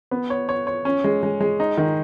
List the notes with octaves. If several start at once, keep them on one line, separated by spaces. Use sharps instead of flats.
B3
C#5
C#5
C#5
C#4
G#3
G#3
G#3
D#4
D#3